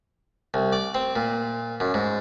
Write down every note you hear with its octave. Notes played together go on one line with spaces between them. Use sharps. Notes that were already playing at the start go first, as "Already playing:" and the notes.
C2
D5
C4
A#2
F#2
G#2